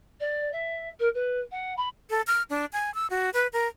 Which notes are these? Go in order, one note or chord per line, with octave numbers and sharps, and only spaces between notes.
D5
E5
A#4
B4
F#5
B5
A4
F6
D4
G#5
E6
F#4
B4
A#4